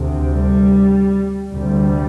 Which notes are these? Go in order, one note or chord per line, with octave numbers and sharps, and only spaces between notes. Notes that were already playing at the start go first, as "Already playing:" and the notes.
Already playing: D2 C3
G3
D2 C3 G3